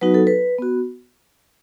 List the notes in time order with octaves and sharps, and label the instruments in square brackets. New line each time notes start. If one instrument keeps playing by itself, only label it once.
[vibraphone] F#3 B3 D#4 F#4 B4
A4
B4
B3 F#4